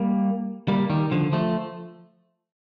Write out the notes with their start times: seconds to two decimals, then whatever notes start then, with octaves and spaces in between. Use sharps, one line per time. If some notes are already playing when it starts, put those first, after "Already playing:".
Already playing: G3 A#3
0.68 G3 A#3
0.90 D#3 G3
1.11 D3 F3
1.33 F3 A3